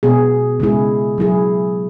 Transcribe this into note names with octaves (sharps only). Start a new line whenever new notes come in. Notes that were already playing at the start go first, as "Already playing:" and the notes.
B2 B3 G#4
C#3 G#3 E4 G#4
F#3 E4 G#4